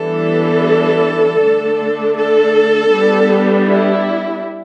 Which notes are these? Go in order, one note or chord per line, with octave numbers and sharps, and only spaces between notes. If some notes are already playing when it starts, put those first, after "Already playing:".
Already playing: E3 G3 B3 D4 A4
D3 A3 D4
A4
G3 B3 D4
E4